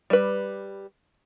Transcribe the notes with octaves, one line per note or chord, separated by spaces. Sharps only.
G3 B4